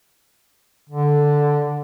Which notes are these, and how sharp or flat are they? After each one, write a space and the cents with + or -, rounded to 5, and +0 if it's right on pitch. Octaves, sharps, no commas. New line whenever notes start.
D3 +0